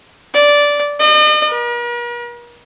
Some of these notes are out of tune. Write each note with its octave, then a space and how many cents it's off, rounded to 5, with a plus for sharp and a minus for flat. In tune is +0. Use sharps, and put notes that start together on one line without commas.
D5 -10
D#5 -45
A#4 +45